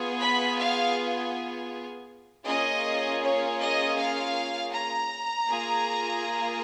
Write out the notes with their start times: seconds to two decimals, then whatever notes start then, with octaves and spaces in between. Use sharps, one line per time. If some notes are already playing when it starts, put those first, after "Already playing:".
Already playing: B3 F4 G#4
0.20 B5
0.57 F5
2.46 A#3 C#4 F4 G#4 D#5
3.21 C#5
3.59 D#5
3.97 F5
4.72 A#5
5.47 A#3 F4 G#4